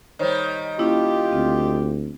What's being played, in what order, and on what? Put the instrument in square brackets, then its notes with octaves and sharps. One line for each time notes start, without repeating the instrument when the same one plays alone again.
[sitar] D#3 G3 [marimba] C5 C#5
[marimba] A#3 C#4 E4 [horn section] F4 G4
[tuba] D2 [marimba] C4